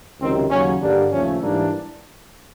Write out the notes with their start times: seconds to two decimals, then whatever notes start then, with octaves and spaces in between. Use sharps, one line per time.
0.20 C#2 C3 D#3 F#3 C4
0.50 D#2 C#3 F#3 C#4
0.81 G2 D3 G3 A#3 D4
1.11 D#2 C#3 F3 A3 C#4
1.41 G#2 E3 G3 A#3 D4